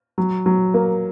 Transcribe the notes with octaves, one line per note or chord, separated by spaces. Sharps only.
F#3
F#3
A#3